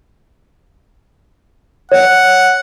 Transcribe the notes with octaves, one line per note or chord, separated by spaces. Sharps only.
C#5 F#5